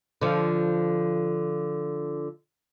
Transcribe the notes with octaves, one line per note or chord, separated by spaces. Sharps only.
D3 F3